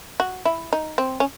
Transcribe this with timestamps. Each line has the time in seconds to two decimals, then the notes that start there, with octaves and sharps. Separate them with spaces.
0.20 F#4
0.45 E4
0.73 D#4
0.98 C4
1.20 C#4